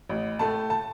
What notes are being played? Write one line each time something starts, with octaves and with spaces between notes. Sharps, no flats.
A1
A2 A3 A5
A5